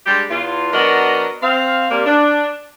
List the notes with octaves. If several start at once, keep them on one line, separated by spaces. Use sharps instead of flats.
G3 G#3 D4 G4
E2 F4
F#3 B3 D4 F#4 A#4 D#5
C4 F5
C3 G3 A#3
D4